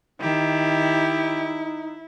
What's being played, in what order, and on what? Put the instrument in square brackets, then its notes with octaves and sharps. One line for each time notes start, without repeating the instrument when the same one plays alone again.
[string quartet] D#3 G4 [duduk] D#4 [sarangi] E4